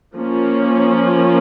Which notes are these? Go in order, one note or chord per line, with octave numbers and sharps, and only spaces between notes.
F3 A#3 C#4